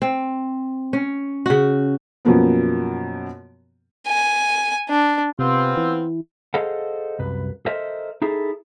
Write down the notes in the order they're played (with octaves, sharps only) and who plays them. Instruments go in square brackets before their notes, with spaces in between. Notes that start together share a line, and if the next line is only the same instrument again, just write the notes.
[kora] C4
C#4
C#3 F#4
[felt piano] F#2 B2 F3 A#3 B3
[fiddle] G#5
D4
[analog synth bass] C3 [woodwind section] B3 C4 F4
[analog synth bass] E3
[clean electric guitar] G#4 A4 C5 D#5 F5 F#5
C2 F#2 B4
A4 A#4 C5 D#5 E5
D#4 E4 G#4 A4